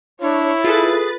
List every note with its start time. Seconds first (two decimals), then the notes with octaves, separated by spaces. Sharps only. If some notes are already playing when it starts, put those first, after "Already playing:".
0.22 D4 E4 C#5
0.64 F4 G#4 A4 B4 A6